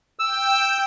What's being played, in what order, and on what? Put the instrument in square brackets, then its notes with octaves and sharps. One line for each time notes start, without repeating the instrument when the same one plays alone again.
[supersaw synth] G5 [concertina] E6